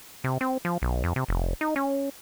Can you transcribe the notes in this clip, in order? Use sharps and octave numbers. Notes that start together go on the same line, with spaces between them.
C3
C4
F3
B1
F2
C3
F1
D#4
C#4